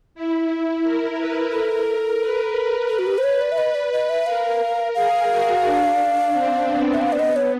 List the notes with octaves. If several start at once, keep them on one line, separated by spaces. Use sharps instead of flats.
E4
A#4
B4
A4 A#4
B4
A4
F#4
G4
C5
C#5
D5
E5
B4 D#5
D5
B4 D#5
E5
A#4 F5
G#4 F5
F#4
D4
C4
B3
E5
B3 F5
D5
D#5
C#5